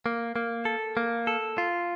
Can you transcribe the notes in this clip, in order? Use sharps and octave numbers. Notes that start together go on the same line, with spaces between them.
A#3
A#3
A4
A#3
A4
F4